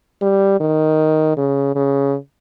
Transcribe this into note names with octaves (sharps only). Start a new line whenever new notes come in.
G3
D#3
C#3
C#3